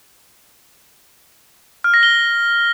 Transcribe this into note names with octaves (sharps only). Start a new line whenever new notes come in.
F6
A#6
G7